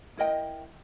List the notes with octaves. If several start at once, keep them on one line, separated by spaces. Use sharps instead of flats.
E4 A#4 D#5 G5